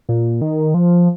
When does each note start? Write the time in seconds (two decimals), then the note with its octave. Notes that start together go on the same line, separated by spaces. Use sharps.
0.09 A#2
0.41 D#3
0.74 F3